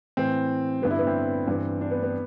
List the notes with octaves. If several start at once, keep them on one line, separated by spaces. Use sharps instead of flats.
A2 E3 C4
G2 D3 B3
E4
B3
C4
G2 E3
D4
B3
B3